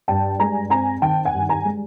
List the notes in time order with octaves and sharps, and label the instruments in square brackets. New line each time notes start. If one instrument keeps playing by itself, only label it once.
[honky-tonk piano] G2 G5 A5
G#3 G#5 A#5
C4 G#5 A#5
D#3 G5 A5
F#5 G#5
G2
G#5 A#5
G#3